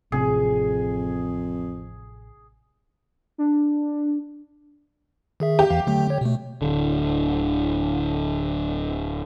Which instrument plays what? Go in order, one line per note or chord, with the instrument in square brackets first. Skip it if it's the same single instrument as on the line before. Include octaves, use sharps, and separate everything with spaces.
[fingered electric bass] A1 C3 [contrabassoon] F2 [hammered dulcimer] G#4
[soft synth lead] D4
[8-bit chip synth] D#3 G#4 E5
[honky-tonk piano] G4
[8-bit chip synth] E2 E3 F5
D3 F#3 A3
D3 C#5
B2 A3
[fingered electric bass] D1 D3